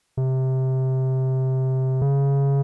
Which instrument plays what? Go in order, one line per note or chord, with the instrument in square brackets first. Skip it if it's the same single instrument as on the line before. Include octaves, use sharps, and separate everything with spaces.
[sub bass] C3
C#3